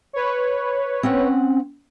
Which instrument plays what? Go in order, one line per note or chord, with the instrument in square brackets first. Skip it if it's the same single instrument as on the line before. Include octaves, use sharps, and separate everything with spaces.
[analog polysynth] B4 C#5
[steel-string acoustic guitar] C4 C#4 F#5